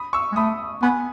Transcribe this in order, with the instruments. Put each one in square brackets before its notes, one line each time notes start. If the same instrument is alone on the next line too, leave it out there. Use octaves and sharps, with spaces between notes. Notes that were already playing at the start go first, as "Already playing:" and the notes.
Already playing: [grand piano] B5 D#6
C#6 E6
[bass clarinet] G#3
[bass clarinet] A3 [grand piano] B5 D#6
[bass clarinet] B3 [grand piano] G#5 B5